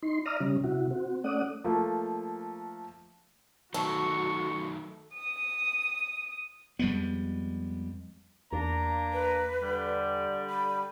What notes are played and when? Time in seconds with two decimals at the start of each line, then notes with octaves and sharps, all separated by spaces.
0.03 D#4 C6
0.26 D5 E5 A#5 D#6 F6
0.40 C#3 G3 C#4
0.64 C3 E4 F#4
0.91 C4 F#4
1.24 A3 C#4 D5 F#5 D#6
1.64 F3 A3 A#3
3.74 D#3 F#3 A3 F#4 A4 C#6
5.14 D#6
6.79 F2 G3 G#3 B3
8.53 E2 A#3 D4 A#5
9.13 B4
9.62 D3 G3
10.49 B5